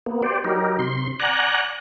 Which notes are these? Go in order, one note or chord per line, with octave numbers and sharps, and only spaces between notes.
A#3 B3
G4 C5 D5
F#3 D#4 G4 A#4
C3 C6
D5 F#5 G#5 A#5 F#6